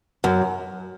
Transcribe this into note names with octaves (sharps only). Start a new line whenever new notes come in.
F#2